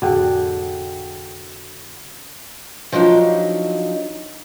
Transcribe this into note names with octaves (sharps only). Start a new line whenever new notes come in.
F1 A2 D3 F#4 G#4 G5
F3 F#3 D4 D#4